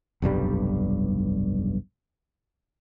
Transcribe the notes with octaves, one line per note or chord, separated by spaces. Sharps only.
F1 B1 G2 G3